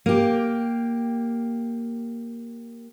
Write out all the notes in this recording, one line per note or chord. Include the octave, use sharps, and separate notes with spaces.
A#3 G4